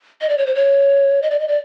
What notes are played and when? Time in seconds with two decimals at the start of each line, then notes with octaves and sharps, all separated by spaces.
0.21 D#5
0.29 D5
0.38 C#5
0.46 C5
0.55 C#5
1.22 D#5
1.30 D5
1.40 D#5
1.48 D5